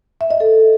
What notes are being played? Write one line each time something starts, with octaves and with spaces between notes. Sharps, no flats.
E5
D#5
A4